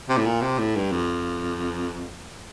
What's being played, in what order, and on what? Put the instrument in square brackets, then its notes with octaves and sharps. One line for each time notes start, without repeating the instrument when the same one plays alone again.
[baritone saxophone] C3
A2
A#2
C3
A2
G2
F2